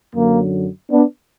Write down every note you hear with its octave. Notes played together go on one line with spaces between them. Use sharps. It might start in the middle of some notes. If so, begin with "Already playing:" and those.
F#2 D3 F#3 A#3
B3 D4